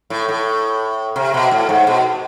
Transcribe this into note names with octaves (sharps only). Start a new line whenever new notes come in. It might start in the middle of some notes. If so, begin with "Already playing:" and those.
A2
A2
C3
B2
A2
G#2
B2